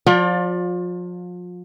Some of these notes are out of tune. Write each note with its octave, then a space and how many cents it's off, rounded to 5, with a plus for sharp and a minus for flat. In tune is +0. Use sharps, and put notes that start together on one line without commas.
F3 +35 F4 +30 D5 +10